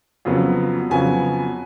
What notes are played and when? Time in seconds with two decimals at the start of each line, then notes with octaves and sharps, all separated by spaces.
0.25 F2 C#3 F#3 B3
0.90 F2 C#3 F#3 B3 G#5